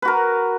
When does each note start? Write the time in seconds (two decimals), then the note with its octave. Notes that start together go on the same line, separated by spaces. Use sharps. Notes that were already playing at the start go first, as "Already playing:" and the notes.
0.02 B4
0.05 F#4
0.08 A#4